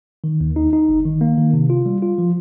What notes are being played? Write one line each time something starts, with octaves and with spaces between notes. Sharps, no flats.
D#3
D#2
D#4
D#4
G1
D#3
A#3
D#3
C3
F4
G3
F4
F3